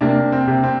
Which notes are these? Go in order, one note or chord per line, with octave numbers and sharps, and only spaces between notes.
C3 A#3 D4
C4
C3
C4